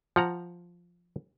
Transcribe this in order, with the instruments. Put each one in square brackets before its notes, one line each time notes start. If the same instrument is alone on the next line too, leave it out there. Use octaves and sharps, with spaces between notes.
[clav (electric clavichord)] F3 F#5 A#5